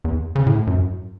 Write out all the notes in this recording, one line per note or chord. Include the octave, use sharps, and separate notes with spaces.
E2
C#3
A2
F#2